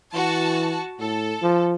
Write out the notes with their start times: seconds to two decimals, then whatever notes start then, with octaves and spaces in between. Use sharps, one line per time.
0.14 E3 F#4 A5
1.00 A2 A4
1.42 F3